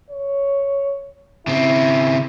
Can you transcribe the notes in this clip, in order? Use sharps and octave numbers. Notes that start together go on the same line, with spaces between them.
C#5
C#3 C4 E4